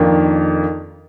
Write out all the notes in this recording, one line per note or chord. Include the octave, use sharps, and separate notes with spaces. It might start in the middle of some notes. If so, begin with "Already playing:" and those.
Already playing: F2 D#3 A#3 D4